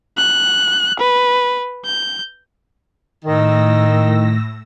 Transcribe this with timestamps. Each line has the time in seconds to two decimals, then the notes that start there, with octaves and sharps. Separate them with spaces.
0.17 F#6
0.99 B4
1.85 G6
3.25 A2 D#3 E6 A#6